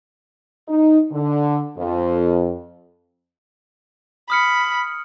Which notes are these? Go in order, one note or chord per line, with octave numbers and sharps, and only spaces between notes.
D#4
D3
F2
B5 D#6 F6 C#7